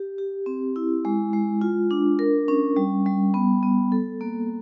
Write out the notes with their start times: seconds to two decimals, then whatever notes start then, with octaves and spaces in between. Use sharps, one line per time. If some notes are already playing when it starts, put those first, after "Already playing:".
Already playing: G4
0.18 G4
0.46 C4
0.76 E4
1.05 G#3
1.33 G#3
1.61 F4
1.91 D4
2.19 A#4
2.48 C#4
2.76 G3
3.06 G3
3.34 B3
3.63 B3
3.92 A4
4.21 A#3